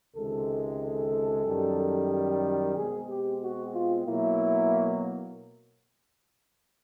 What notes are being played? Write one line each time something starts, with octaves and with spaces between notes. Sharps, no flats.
C#2 C3 D#3 G#3 A4
A4
F#2 D#3 G3
B2 G#3 C4 G#4
G4
F#4
F4
B2 F#3 A#3 E4